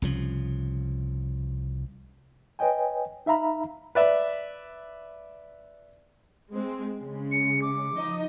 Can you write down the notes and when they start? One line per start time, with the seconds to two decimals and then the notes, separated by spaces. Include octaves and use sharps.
0.02 C2 C#3 F3
2.59 B4 C#5 D#5 G5 G#5
3.26 D#4 E5 F5 A#5 B5
3.95 B4 D5 E5
6.50 G#3 C4
6.94 C#3 G#3
7.32 C#7
7.62 D6
7.94 F3 D#4 D#5